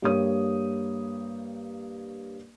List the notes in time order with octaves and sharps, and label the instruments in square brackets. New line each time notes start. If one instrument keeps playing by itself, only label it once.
[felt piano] G2 A#3 G4 C#5 D#6